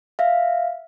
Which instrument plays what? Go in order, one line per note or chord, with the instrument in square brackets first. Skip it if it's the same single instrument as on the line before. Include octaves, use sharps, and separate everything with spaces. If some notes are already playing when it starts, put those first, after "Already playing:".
[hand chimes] E5 F5